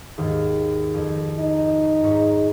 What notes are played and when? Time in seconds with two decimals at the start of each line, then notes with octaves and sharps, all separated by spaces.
0.18 D#2 G#2
0.94 F2
1.38 D#4
2.03 G#2 C#5 B6